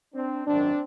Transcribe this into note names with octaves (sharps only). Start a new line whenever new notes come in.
C4 D4
G#1 F#2 D#3 F#3 C4 D4